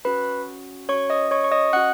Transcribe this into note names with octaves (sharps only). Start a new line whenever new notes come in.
C#4 F#4 B4 B5
C#4 F#4 C#5 C#6
D#5 D#6
C#5 C#6
C#6
D#5 D#6
C#4 F#4 F#5 F#6